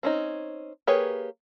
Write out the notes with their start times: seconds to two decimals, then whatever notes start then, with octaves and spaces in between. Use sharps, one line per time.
0.03 C4 C#4 D#4
0.87 A#3 G4 G#4 B4 C#5